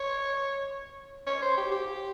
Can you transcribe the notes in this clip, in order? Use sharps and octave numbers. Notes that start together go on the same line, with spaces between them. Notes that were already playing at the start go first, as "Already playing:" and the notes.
Already playing: C#5
C#5
C5
G4
G4